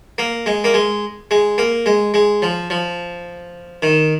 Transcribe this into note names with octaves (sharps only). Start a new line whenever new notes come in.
A#3
G#3
A#3
G#3
G#3
A#3
G#3
G#3
F3
F3
D#3